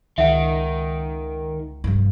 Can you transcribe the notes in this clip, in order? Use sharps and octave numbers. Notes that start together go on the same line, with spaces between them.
C#2 D#3 E5 F#5
F1 G2